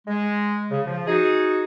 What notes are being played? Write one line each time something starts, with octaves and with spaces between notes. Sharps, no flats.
G#3
C#3
F3
D#4 F#4 G#4